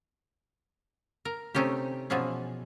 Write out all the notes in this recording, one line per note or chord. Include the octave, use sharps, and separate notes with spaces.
A#4
C3 A3 C#4 D#4 G4
B2 E3 F3 C#4 G#4